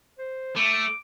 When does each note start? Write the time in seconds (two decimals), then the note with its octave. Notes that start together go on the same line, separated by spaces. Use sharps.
0.18 C5
0.56 A3 D6